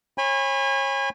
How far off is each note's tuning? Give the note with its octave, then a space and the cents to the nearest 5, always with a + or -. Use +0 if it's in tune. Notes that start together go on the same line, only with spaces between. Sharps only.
C#5 -30 G#5 -30 B5 +0